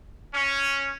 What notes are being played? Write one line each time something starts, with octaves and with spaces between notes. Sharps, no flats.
C#4